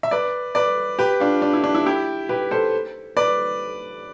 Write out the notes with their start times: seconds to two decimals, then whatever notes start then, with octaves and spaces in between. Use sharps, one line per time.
0.03 E5
0.11 B4 D5
0.55 B4 D5
0.99 G4 B4
1.20 D4 F4
1.42 D4
1.53 E4
1.64 D4
1.75 E4
1.86 E4 G4
2.29 G4 B4
2.51 A4 C5
3.17 B4 D5